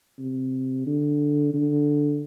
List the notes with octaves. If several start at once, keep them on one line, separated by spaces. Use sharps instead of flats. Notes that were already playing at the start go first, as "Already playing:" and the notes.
C3
D3
D3